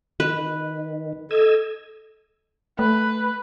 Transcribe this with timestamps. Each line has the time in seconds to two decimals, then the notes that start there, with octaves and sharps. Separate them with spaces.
0.20 D#3 B4
1.31 A4 D#5 E6 G#6
2.79 A3 B4